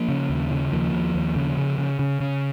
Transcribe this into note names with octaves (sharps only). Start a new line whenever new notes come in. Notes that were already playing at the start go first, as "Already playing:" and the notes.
Already playing: F3 A#3
C#3
D#2
C#3
D#2 F3 A#3
D#2
D#2
C#3
C#3
C#3
C#3
C#3